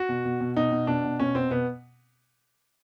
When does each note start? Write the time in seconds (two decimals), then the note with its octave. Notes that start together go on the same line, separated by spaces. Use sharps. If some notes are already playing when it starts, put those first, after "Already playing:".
Already playing: F#4
0.09 B2
0.25 B2
0.40 B2
0.56 B2 D#4
0.71 B2
0.87 B2 D4
1.04 B2
1.19 B2 C#4
1.35 B2 C4
1.51 B2 B3